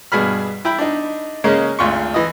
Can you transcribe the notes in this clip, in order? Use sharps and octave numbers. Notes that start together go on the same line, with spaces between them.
G2 B2 G#4 B5 F6
E4 G5 B5
D4 D#4
C#3 G#3 A#3 C#4
G#1 D2 F4 C6 C#6
E3 D#5